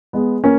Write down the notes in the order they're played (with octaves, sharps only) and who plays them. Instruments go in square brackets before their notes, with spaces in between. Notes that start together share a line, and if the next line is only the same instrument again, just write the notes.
[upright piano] G#3 B3
A#3 C#4